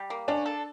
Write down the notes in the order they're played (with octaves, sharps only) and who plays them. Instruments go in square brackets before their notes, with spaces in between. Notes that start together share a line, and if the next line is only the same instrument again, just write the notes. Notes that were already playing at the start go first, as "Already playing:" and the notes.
Already playing: [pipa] G3
A#3
[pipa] C#4 [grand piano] D4
[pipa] A4